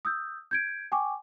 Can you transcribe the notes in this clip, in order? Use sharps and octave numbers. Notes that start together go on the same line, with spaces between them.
D#6 E6 G6
G6 G#6 D7
G5 G#5 C#6 D6